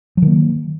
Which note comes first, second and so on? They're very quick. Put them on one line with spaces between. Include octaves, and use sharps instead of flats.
F#3 D#3 A#3